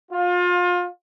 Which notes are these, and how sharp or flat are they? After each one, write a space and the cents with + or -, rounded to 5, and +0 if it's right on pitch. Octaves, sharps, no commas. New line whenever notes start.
F4 +30